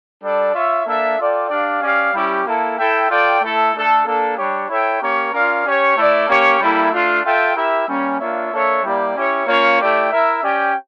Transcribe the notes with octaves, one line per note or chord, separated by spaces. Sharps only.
G3 D4 A4 D5
F4 C#5 E5
A#3 D4 A4 E5
F4 A4 D5 G5
D4 G4 D5 F5
C#4 G4 D5 F5
G3 C#4 E4 G4
A#3 E4 A4
E4 A4 E5 G5
F4 A4 D5 G5
A3 E4 A4 E5
A3 D4 A4
A#3 D4 A4
G3 D4 G4 C#5
E4 A4 C#5 E5 G5
A#3 C#4 G4 A#4 C#5
C#4 F4 A#4 D5 F5
C#4 G4 C#5
A3 E4 A4 D5
A#3 C#4 G4 C#5
G3 A#3 E4 A4
A3 D4 F4
F4 A4 E5 G5
E4 G4 A#4 E5
G3 A#3 C#4
A#3 D4 F4 C#5 E5
A#3 D4 A4 C#5 E5
G3 A#3 E4 G4 D5
C#4 E4 G4 C#5
A#3 C#4 F4 C#5
A3 E4 G4 D5 G5
E4 A#4 E5
C#4 G4 D5 G5